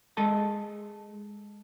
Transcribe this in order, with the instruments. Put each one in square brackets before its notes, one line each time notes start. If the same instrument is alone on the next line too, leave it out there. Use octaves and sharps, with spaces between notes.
[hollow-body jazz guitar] G#3 A4 D#5 A5